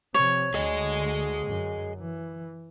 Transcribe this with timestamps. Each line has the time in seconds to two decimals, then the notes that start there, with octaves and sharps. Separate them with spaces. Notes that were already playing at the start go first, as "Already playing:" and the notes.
0.14 C3 F3 C#5
0.54 D2 D3 G#4 D#5
1.46 F#2
2.00 E3